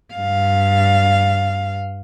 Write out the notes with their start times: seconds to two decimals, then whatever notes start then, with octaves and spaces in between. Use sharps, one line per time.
0.14 G2 F5